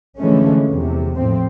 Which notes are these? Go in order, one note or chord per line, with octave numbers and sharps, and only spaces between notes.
D3 E3 F3 G#3 A3 C#4
E2 C3
A2 F3 C4